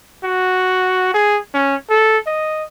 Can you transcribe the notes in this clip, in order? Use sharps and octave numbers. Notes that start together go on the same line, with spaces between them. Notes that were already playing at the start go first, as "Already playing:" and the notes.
F#4
G#4
C#4
A4
D#5